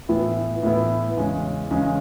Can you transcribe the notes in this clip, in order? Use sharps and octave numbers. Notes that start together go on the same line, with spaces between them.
A2 E3 B3 E4
A2 E3 B3 E4
E2 C#3 G#3 C#4
E2 C#3 G#3 C#4